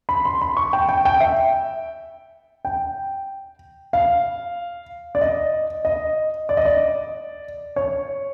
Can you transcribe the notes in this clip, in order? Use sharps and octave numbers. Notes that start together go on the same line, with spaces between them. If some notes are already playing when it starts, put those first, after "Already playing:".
B5
C6
B5
C#6
G5
G5
G5
E5
G5
F5
D5
D#5
D#5
D5
D#5
D5
C#5